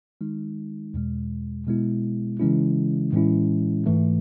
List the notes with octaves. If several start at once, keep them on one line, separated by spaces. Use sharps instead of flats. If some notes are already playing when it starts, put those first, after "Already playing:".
D#3 G#3 D#4
E2 B2 G#3
B2 G#3 B3 E4
C#3 E3 G#3 C#4 E4
A2 E3 G#3 C#4 E4
G#2 E3 A3